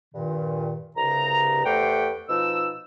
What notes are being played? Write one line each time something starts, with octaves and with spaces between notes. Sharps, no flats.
G2 A#2 D#3
C2 G2 C#3 A#5
E2 A3 G4 C5 F#5 G5
B2 F3 D#4 E6